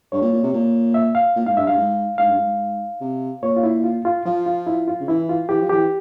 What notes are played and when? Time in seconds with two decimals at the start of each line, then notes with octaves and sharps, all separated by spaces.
0.12 G2 C#5
0.21 A#2
0.32 A#2
0.43 C3
0.53 A#2
0.94 E5
1.15 F5
1.36 A#2
1.46 G#2 F5
1.57 G2 E5
1.67 G2 F5
1.77 G#2
2.18 G#2 F5
2.29 G2
2.38 G#2
3.01 C3
3.43 A#2 C#5
3.56 F4
3.63 E4
3.84 F4
4.05 F4
4.26 F3 F4
4.46 F4
4.67 E4
4.88 F4
5.00 C#3
5.08 E3 E4
5.29 F4
5.49 E3 G4
5.61 F3
5.70 E3 G4